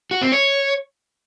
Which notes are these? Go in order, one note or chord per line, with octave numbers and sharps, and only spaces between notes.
F#4
C4
C#5